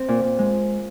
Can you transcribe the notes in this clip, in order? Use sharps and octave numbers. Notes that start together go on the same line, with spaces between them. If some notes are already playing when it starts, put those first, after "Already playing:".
Already playing: C4
A#2
A#2
G#3